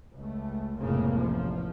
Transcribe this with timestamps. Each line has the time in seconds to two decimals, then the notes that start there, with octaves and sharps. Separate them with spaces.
0.13 C#2 A3
0.79 F1 C#2 A2 C#3 A#3
1.19 A1 F3